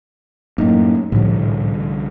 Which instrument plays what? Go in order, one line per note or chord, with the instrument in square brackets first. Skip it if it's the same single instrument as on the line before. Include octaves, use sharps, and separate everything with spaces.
[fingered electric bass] F#2 A2 [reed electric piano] A#3 D#4
[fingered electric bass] C2 D3 [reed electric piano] A2 F3